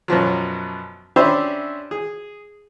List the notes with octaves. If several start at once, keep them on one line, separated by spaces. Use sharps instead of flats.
F#2 B2 F3 F#3
C#4 D4 G4 C5 E5 B5
G#4